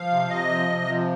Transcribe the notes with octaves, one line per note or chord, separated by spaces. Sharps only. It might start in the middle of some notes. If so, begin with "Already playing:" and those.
Already playing: F3 F5
C3
C3 D#5
F3
C3
F3